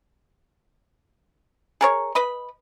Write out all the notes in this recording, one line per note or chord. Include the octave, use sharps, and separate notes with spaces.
G#4 A#4 C#5
B4 D#5 B5